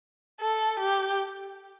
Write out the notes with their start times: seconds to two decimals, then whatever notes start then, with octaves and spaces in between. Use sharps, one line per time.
0.41 A4
0.80 G4